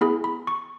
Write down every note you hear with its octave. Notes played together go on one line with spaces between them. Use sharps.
B3 E4 G#4 B5
B5
C#6